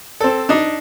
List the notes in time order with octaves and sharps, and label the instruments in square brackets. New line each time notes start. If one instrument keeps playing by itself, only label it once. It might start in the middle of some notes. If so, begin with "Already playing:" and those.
[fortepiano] C4 A4
D4 D#4